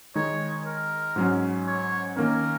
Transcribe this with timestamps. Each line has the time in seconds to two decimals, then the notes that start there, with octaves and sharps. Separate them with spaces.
0.15 D#3 G#3 D#4 C#5
0.66 A#4
1.16 G#2 F#3 C#4
1.67 C#5
2.17 D#3 A#3 C#4 A#4